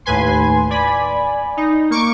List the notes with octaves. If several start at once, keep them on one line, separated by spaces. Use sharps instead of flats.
D#2 A2 B4 G#5 C6
D5 G#5 B5
D#4
A#3 C#6 D6